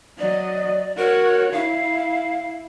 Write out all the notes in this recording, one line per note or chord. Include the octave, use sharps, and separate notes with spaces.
F#3 D5 D#5
F#4 A#4 C#5
E4 F5